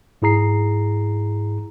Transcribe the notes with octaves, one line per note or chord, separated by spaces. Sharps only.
G#2 E4 G#4 A#5 C7